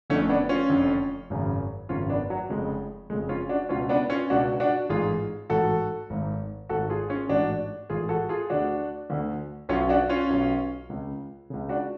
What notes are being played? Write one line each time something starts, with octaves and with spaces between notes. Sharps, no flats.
F1 F2 D3 A3 C#4
B3 D4
C#4 F4
F1 F2 D3
G#1 F#2 C#3
G#1 F#2 C#3 C#4 F4
B3 D4
F#3
F1 F2 C#3 G#3
F1 F2 C#3 G#3
C#4 F4
D4 F#4
C#2 B2 C#4 F4
B3 D4
C#4 F4
C#2 B2 D4 F#4
D4 F#4
A1 G#2 F4 G#4
A1 G#2 F#4 A4
G#1 G#2
G#1 G#2 F#4 A4
F4 G#4
C#4 F4
A1 G#2 D4 F#4
A1 G#2 F4 G#4
F#4 A4
F4 G#4
D2 D3 D4 F#4
D2 D3
B1 B2 C#4 F4
D4 F#4
C#4 F4
B1 B2
C#2 C#3
C#2 C#3
D4 F#4